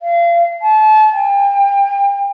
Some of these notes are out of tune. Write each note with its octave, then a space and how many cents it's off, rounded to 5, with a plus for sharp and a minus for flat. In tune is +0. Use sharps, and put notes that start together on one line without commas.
F5 -30
A5 -30
G5 +35